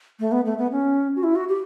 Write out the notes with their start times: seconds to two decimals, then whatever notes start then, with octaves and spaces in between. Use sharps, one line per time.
0.20 A3
0.32 B3
0.45 A3
0.58 B3
0.72 C#4
1.16 F#4
1.23 E4
1.36 F#4
1.48 G4